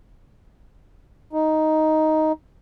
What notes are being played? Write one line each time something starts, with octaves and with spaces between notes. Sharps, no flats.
D#4